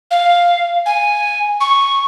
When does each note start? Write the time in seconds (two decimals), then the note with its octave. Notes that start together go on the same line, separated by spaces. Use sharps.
0.11 F5
0.86 G#5
1.61 C#6